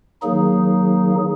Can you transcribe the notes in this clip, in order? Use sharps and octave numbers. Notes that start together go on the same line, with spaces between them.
D#3 F#3 A#3 D#4 G#4